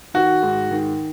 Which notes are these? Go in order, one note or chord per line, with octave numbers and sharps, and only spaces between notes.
D#3 F#4
G#2
D#3